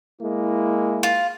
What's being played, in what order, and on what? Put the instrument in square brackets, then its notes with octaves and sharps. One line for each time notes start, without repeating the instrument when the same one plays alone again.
[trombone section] G#3 A#3 E4
[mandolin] F4